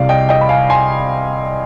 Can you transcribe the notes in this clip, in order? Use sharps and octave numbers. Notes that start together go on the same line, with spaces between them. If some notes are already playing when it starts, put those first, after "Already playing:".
Already playing: C2 C3 G3 D5 F5
D#5 G5
D#5 G5
B5
F5 G#5
G#5 C6